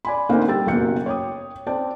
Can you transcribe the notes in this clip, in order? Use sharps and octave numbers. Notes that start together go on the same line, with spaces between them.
D5 G#5 B5
D2 A#3 C4 D#4 F#5
G3 G4 G5 E6 A6
F#1 B2 A#3 F#4 G6 C#7
C#5 G5 D6 D#6
C4 D5 G5 A5